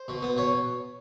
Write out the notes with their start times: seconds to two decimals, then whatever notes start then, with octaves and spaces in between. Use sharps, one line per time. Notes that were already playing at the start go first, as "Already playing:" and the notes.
Already playing: C5
0.08 B2
0.22 B3
0.37 B2 C#5